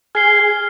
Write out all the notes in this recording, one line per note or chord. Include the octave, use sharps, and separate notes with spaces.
G#4 F6 C7 G7